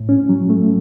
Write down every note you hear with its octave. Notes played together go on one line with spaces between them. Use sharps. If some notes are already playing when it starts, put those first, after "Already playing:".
Already playing: A2
C#4
F#3
A3